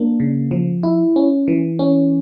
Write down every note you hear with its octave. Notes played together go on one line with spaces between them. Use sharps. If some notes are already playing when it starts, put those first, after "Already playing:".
Already playing: A#3 D4
C#3
F3
E4
C#4
E3
C#4